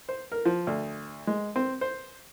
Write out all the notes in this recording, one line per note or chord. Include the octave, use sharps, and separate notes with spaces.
C5
A#4
F3
D2
G#3
C4
C5